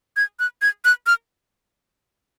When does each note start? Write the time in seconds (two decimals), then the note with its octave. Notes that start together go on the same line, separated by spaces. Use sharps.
0.17 G#6
0.40 F#6
0.62 G#6
0.85 F#6
1.07 F6